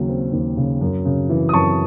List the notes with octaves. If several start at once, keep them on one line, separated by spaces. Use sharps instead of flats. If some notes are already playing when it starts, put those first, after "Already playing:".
Already playing: D#2 C#3 F#3
C4
D#2
C#3
F#2
C#3
E3
D#6
F#2 A5 C#6